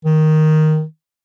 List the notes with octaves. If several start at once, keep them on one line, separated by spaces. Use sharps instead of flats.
D#3